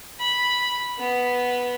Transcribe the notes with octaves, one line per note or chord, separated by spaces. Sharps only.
B5
B3